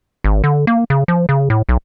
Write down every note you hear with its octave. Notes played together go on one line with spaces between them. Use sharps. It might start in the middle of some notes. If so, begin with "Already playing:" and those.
G#1
D3
A#3
C#3
F3
C#3
A2
B1